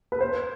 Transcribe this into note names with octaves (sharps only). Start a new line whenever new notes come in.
B4
C5